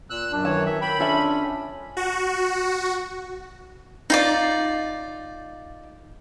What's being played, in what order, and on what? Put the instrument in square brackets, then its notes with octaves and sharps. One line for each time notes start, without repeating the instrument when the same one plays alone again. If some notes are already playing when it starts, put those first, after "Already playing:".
[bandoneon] A#2 [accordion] E6 F#6
[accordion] F#2 [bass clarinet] D4
[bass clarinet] D#3 [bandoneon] E3 C#5 [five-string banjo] A5
[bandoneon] E3 E5
[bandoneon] G5 [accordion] B5
[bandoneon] C#4 [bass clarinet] D4 [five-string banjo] F4 A4 E5
[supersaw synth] F#4
[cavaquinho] D#4 F4 D5